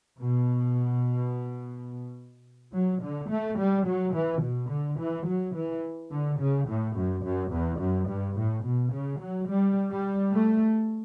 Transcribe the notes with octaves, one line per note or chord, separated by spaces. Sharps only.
B2
F#3
D3
A3
G3
F#3
E3
B2
D3
E3
F#3
E3
D3
C#3
A2
F#2
F#2
E2
F#2
G2
A2
B2
C#3
F#3
G3
G3
A3